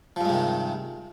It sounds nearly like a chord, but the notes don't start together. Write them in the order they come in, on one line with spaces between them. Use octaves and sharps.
F3 G2 G#3 C3 D#3